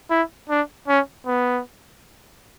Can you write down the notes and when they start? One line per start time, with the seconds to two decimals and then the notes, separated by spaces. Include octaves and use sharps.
0.10 E4
0.49 D4
0.88 C#4
1.26 B3